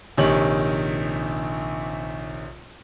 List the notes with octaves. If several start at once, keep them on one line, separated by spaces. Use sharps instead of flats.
A#1 C3 D#3 C#5 F#7